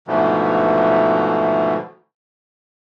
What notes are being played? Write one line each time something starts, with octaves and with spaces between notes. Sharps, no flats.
G#2 B2 D3 E3 F3 A3